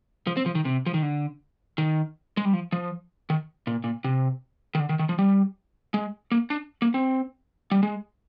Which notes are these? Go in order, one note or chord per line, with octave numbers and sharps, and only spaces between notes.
F3
C4
F3
D#3
C3
F3
D#3
D3
D#3
G#3
G3
F3
F3
D#3
A#2
A#2
C3
D#3
D3
D#3
D#3
F3
G3
G#3
A#3
D4
A#3
C4
G3
G#3